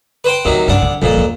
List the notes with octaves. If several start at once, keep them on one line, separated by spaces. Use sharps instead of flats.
B4 C5 G5
D2 C3 D#3 F#3
C2 G2 D4 F#5
D3
D#1 F2 A#2 F3
E2 D#3